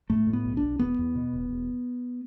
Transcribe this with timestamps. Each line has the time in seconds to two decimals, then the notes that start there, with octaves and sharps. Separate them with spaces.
0.10 A2 A3
0.27 A2
0.33 B3
0.45 B1
0.57 D4
0.62 B1
0.79 E1 B3
0.98 E2
1.15 B2
1.33 E1
1.50 E1